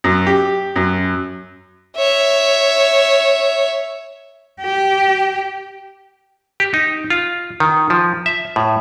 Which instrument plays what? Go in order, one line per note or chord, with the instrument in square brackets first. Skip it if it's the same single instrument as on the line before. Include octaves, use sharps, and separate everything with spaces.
[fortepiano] F#2
G4
F#2
[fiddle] C#5 E5
[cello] G4
[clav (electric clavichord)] G4
D#4
F4
D#3
F3
E5
A2